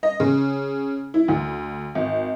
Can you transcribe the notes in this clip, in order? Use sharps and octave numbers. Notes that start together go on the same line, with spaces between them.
D#5
C#3
E4
D2
G#1